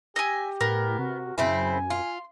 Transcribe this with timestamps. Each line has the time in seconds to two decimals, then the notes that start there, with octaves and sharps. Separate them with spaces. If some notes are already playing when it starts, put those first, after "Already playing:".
0.16 G4 D#5 E5 G#5
0.61 A2 B3 A#4
0.99 C3 F#4
1.38 F#2 C#3 C4 E4 G#5
1.90 F4 C6